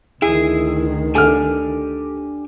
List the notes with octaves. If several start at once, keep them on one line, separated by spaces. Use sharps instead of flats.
D2 D#3 E4 G#4
D4 G4 A4 G#5 F6